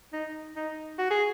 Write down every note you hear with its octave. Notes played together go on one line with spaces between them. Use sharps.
D#4
D#4
F#4
G#4